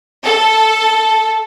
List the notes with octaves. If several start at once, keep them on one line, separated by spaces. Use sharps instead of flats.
A4